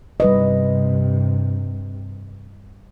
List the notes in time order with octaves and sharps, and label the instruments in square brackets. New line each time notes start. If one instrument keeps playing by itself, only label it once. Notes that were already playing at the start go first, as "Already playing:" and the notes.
[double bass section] G2 C3 [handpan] G3 B4 D#5